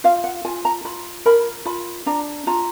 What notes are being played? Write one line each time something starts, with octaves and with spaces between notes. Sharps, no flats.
F4 F5
F#5
F4 G#5
A#5
F4 B5
A#4 B5
F4 B5
D4 A#5
F4 A#5